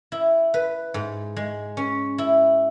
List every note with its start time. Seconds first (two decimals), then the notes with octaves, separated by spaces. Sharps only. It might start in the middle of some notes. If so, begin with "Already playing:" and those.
0.12 E4
0.54 B4
0.94 G#2
1.36 G#3
1.77 C#4
2.18 E4